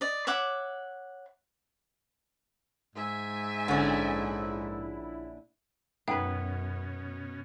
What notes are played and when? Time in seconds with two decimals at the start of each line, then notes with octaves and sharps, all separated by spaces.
0.01 D5 D#5
0.27 C#5 E5 F#5 D6
2.96 G#2 E5 G#5
3.68 A#1 D3 C#4 E4
6.08 F#2 B2 B3 C#4 D#4 B4 E5 G5